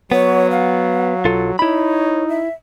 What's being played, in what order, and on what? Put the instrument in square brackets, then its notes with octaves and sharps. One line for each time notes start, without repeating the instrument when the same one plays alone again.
[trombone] F#3 [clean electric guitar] B3 [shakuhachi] C#5
[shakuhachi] F5
[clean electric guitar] B1 F4 A4
[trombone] D#4 [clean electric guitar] E4 B5 [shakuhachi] C#5
[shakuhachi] E5